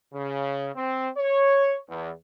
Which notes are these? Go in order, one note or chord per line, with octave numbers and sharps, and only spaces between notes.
C#3
C4
C#5
E2